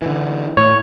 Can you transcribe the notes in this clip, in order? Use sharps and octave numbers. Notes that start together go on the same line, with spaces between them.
D3 E3
A2 C#5